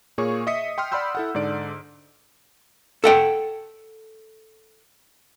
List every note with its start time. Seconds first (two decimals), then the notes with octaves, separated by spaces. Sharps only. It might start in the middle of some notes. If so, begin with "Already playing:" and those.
0.18 A#2 A#3 G#4 C#5 C#6
0.47 D#5 E5 D#6 B6 C#7
0.78 G5 C6 D#6 F6
0.92 D5 F#5 B5 C6 E6 G6
1.15 E4 A4 F#5
1.35 G#2 D3 D5 D7
3.04 A4 F#5 G5